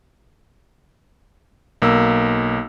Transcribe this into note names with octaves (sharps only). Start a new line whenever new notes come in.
B1 A#3 E6